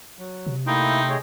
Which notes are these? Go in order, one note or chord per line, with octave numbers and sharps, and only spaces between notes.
F#3
C3
A3 A#3 D#4 E4 G5 C6
G#4 C#5 D#5